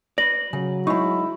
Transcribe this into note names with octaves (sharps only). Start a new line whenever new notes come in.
B4 D5 A#6 F#7
C#3 F#3
G#3 D#4 E4 C#6